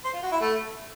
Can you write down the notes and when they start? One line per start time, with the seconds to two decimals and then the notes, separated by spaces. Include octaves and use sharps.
0.04 C5
0.13 F4
0.22 F#4
0.31 E4
0.40 A3